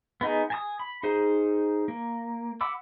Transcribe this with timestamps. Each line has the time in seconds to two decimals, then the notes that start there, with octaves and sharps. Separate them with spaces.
0.21 B3 D#4 G#4
0.50 G#5 A5 D#6
0.79 B5
1.03 D#4 G#4 C5
1.88 A#3
2.61 F#5 B5 D6 E6